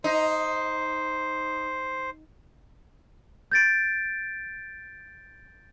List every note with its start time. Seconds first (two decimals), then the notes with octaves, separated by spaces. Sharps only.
0.04 D#4 C5
3.52 G6 A6 D7